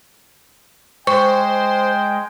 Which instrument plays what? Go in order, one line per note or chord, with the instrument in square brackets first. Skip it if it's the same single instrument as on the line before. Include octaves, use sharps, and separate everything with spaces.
[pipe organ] G#3 [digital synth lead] C5 [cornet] G5 [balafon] C#6